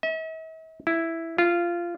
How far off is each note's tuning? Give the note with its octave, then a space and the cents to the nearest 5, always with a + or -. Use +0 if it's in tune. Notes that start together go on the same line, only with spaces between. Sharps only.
E5 -45
E4 +0
F4 -15